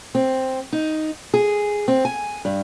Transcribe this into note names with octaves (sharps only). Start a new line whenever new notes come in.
C4
D#4
G#4
C4
G#5
G2